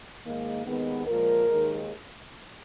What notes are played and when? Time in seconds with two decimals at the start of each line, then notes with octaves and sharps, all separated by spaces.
0.25 G#2 D#3 G#3 A#3
0.66 D#2 D#3 G#3 B3
1.07 A#2 F3 G#3 A#4
1.49 D#2 D#3 G#3